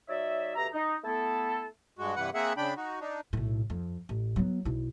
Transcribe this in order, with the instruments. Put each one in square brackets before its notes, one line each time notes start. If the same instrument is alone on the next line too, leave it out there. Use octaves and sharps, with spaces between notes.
[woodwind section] F#3 D#4 C#5 D5 E5
D2 B2 G4 E5 A#5
D#4
A3 B3 E4 A4
[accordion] G2 G#3 F#4
G2 C3 E3 B4 F#5
A#3 C4 G#4 E5 F#5
C#3 D4 G5 B5
D#4 F#4
D4 D#4
[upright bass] B1 A2
F2
A1
F#3 B3
B1 E4